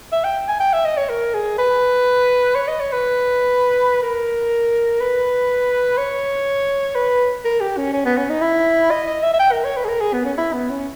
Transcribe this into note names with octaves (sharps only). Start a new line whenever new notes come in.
E5
G5
G#5
G5
E5
D#5
C#5
A#4
G#4
B4
C#5
D#5
C#5
B4
A#4
B4
C#5
B4
A#4
G4
C#4
C#4
B3
C#4
D#4
E4
D#5
D#5
E5
E5
G5
A#4
C#5
B4
G#4
A#4
G#4
B3
C#4
E4
B3
C#4